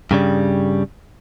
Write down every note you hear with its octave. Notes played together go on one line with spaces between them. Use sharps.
G2 C#3 G3